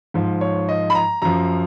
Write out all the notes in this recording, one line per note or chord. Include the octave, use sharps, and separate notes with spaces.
G#2 F3
C#5
D#5
B5
A#5
F#2 F3 A#5